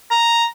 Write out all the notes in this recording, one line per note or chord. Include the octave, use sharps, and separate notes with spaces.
A#5